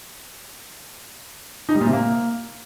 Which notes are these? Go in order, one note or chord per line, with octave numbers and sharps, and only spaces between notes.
D#4
G3
A#2
C3
A#3